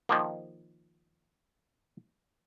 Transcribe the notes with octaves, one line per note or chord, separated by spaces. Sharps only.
D#3 F3 A#3